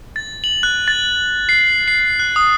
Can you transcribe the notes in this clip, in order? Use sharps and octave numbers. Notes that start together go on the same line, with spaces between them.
A6
F#7
F#6
A6
C7
C7
F#6
D#6